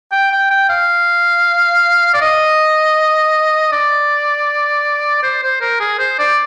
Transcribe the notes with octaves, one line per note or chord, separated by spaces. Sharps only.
G5
G5
G5
F5
D5
D#5
D5
C5
C5
A#4
G#4
C5
D5